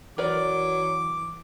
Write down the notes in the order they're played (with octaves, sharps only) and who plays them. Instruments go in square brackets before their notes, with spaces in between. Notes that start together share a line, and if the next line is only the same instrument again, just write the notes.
[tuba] E3 [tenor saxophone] F#3 [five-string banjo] A#4 B4 D5 [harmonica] D6